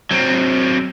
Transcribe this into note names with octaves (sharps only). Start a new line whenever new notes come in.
F#3 C4